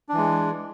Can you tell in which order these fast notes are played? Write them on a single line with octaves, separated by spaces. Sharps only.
D4 E3 G#3